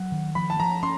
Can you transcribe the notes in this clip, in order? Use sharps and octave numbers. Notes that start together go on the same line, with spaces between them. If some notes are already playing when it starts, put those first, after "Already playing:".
Already playing: F#3 F#5
D#3
F3 B5
A5
F3 A#5
C#4 C6